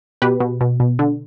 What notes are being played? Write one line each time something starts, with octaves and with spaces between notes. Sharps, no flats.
B2 G4 B4
B2
B2
B2
D3